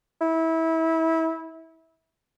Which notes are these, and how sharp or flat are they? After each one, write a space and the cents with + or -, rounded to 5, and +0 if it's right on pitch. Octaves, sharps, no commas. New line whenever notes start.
E4 -25